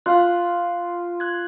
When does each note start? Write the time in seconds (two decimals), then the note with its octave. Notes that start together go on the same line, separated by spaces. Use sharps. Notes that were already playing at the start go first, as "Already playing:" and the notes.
0.06 F4 F5 F#6
1.20 F#6 G#6